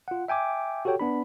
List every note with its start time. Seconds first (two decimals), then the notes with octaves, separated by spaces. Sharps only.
0.08 F4 F#5
0.28 E5 G5 G#5 D6
0.85 F#4 G4 A4 C#5 G5
1.00 B3 D4 B5